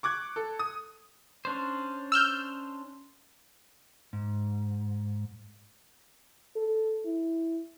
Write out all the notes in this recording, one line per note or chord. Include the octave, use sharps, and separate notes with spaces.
C#6 D6 F#6 G#6
A4
D#6
C#4 D4 C5
E6 F6 G6
G#2
A4
E4